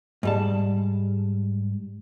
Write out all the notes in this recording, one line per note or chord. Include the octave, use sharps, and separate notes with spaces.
G#2 G3 A5